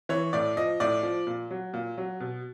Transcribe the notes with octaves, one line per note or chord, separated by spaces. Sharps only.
E3 C#5
A2 D5
F3 D#5
A2 D5
F3
A#2
F#3
A#2
F#3
B2